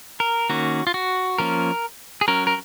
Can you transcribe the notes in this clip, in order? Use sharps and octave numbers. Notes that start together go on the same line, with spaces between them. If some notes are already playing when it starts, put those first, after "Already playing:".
A#4
D#3 A#3 C#4 F#4
F4
F#4
F3 A#3 C#4 A#4
G#4
F#3 C#4 A#4
A#4